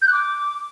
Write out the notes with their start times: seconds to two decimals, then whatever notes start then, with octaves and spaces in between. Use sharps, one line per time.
0.02 G6
0.07 F#6
0.12 D6